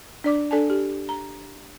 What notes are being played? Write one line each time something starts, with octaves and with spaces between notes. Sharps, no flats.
D4 D5 D6
D4 A4 D5 G#5 A5
G4
A#5